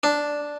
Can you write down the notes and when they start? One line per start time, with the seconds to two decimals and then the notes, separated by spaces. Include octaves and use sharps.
0.03 D4